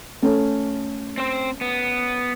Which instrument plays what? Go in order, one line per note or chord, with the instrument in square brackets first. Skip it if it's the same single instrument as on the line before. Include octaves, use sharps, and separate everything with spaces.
[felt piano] A3 C#4
[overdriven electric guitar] C4 C5
B3